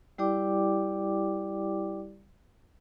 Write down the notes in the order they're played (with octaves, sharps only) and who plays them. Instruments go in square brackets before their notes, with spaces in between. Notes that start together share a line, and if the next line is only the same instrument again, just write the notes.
[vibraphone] G3 E4 G4 D5 G5 D6